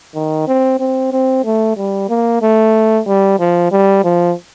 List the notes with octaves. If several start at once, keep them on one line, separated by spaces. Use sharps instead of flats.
D#3
C4
C4
C4
A3
G3
A#3
A3
G3
F3
G3
F3